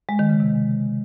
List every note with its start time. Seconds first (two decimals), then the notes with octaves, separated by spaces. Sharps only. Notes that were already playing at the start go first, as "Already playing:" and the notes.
0.09 G#3
0.19 D#3
0.30 C#3
0.40 C3